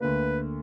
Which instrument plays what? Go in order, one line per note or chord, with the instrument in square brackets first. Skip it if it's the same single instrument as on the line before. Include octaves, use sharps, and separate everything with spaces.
[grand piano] D2 D3 A#3 [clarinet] B4